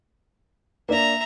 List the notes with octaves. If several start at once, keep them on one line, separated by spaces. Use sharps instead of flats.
A#3 D4 E5 A#5